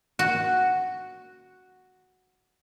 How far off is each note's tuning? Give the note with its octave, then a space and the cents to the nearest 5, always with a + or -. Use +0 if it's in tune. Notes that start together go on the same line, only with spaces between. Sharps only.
F#4 +0 F#5 +0